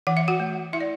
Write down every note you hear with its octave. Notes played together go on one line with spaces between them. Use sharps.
E3 F#5
E5
F#4 F#5
A3
E4 E5
D5